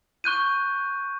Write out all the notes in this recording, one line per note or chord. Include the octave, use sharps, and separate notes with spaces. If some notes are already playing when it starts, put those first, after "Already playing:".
C#6 F#6 G6 D#7